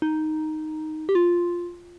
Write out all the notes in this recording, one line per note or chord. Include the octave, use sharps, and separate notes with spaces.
D#4
G4
F4